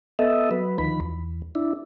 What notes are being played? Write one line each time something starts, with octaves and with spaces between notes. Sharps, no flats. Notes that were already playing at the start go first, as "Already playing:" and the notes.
B3 A4 D#5 E5
F#3 B4
D2 D#3 F3 B5
E2
D4 E4